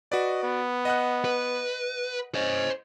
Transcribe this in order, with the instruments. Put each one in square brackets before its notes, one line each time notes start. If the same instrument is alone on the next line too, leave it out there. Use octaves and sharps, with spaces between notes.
[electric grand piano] F#4 B4 D5 [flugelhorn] D#5
[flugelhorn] B3
[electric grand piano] D#5 F#5 F#6
[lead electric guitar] B4
[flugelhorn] C#4 [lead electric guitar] C5 D#5